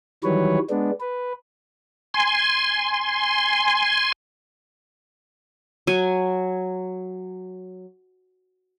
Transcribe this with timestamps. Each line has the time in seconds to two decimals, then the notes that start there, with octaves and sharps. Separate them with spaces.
0.24 D#3 E3 F#3 G3 B4 C#5
0.70 G#3 B3 D4
1.00 B4
2.14 G#5 C6
5.87 F#3 G#5